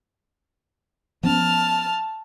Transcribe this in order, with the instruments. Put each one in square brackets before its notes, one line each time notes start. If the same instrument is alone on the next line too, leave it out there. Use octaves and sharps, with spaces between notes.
[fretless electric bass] F3 B3 C#4 [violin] A5 F6